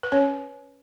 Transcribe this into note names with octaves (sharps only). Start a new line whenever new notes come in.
B4
C#4 C#5